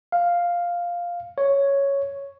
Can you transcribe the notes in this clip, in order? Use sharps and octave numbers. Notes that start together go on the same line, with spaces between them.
F5
C#5